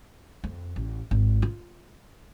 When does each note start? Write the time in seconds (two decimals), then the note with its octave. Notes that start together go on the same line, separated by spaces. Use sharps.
0.44 F2
0.76 A1
1.11 G#1
1.42 F4